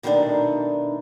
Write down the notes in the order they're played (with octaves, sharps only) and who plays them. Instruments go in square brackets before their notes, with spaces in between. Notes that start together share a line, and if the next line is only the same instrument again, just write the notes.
[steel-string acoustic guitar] B2 D#3 A3 A#3 D4 D#4